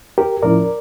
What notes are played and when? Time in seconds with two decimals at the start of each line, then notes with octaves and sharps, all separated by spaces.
0.18 G4 A#4
0.42 A2 F3 C#4 E4 A#4 D5